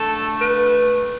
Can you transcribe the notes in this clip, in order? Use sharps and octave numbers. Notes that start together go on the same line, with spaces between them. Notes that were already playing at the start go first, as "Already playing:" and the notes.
Already playing: D3 A3 A4
B4